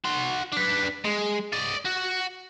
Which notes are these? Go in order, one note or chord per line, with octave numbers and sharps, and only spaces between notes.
F#4 C6
D4 B4
G#3
D5 D#5
F#4